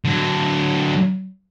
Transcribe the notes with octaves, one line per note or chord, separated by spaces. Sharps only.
D3 F#3